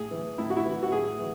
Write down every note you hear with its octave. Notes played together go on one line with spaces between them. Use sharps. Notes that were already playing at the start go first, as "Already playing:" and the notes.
Already playing: A2 G#4
E3
A2 E4
F#4
E4
E3
F#4
A2 G#4
E3